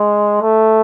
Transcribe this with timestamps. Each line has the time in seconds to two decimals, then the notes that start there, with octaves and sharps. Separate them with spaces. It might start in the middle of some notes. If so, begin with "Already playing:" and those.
Already playing: G#3
0.41 A3